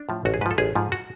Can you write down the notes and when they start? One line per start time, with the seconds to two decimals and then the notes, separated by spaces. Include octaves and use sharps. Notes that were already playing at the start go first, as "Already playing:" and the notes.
Already playing: D4
0.09 A2 F3
0.25 A1 F#4
0.34 G#4
0.41 G#2 B4
0.46 F3 A4
0.58 A1 G#4
0.75 G#2 F3
0.92 F#4